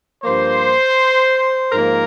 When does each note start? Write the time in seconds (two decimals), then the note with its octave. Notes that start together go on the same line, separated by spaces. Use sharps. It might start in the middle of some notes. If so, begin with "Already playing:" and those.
0.23 G2 F3 A#3 C5
1.71 G#2 F3 A#3 A#4